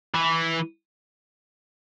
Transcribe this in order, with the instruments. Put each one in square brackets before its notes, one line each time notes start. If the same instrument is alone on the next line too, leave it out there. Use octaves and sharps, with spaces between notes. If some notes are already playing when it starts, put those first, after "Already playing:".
[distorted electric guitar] E3